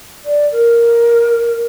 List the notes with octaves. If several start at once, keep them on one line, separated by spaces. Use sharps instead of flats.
D5
A#4